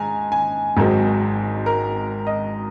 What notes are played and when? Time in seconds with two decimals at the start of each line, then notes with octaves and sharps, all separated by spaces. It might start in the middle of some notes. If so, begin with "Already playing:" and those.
Already playing: G#2 G#5 A#5
0.32 G#5
0.77 G#1 G#2 D#3 F#3 C4
1.66 A#4
2.27 D#5